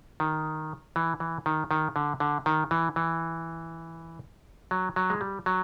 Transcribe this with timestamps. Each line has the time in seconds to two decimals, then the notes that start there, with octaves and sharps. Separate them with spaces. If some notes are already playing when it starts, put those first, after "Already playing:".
0.20 D#3
0.96 E3
1.20 E3
1.46 D#3
1.71 D#3
1.96 D3
2.20 D3
2.46 D#3
2.71 E3
2.96 E3
4.71 F#3
4.96 F#3
5.10 G#3
5.21 G3
5.46 F#3